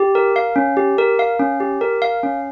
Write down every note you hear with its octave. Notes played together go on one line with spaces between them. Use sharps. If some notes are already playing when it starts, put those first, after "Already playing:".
Already playing: G4
A#4
F5
C#4
G4
A#4
F5
C#4
G4
A#4
F5
C#4